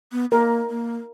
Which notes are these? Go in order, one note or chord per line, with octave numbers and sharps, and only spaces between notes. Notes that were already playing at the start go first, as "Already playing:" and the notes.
B3
A#3 A#4
A#3